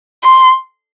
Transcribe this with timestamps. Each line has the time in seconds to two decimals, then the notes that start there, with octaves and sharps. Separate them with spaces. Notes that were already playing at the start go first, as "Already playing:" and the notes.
0.23 C6